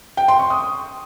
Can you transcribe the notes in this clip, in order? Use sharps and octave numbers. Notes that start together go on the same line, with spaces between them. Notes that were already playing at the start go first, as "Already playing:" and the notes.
G5
C6
C#6
D#6